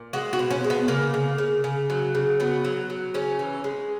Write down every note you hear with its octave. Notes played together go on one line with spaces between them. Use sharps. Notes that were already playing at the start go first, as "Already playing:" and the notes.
Already playing: A#2
G#3 F#4
F#4
B2
C#4
G#3
B3
C#3 A#3
C#3
C#3
C#3
F#3
C#3
F#3 B3
F#3
F#3
C#3 C#4
E3
G#3